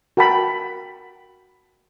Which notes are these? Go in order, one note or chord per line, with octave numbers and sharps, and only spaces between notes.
F#4 A#4 G5 A5 B5